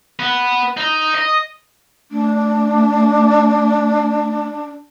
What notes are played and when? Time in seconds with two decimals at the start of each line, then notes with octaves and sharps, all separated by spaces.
0.20 B3
0.77 D#4
1.15 D#5
2.12 A3 D4